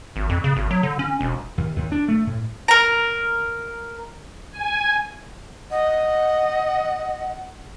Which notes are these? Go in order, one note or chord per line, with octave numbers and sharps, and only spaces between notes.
G#1
F2
C#3
G#1
F#3
D3
C#4
E1
D#2
D#2
D4
A3
A2
A#4 A#5
G#5
D#5 F#5